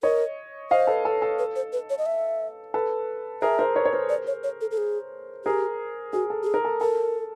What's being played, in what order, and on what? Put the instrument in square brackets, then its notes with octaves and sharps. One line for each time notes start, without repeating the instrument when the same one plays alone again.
[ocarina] A#4 [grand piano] C#5 D#5
[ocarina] C5 [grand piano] D#5 F5
[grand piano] A4 B4
A4
A4
[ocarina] B4
C5
B4
C#5
D#5
E5
[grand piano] A4 B4
[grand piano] G#4 A#4 [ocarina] E5
[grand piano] A#4 C5
B4 C#5
C#5
A#4 C5
[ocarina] D5
C#5
C#5
A4
A4
G#4
[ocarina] G4 [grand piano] G#4 A#4
[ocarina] F#4 [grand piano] G#4
[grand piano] A4
[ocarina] G4
G#4
[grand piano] A#4
A4
[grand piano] A4 [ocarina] A#4